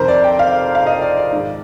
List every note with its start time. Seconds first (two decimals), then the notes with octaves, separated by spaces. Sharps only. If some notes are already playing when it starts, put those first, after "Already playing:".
Already playing: F2 C3 D#3 A#4 C5
0.08 D5
0.24 G5
0.39 F5
0.75 F5
0.86 D#5
1.01 D5
1.17 D5
1.32 G#2 D#3